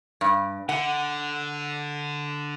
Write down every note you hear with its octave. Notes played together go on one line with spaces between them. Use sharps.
G2
D3 F#5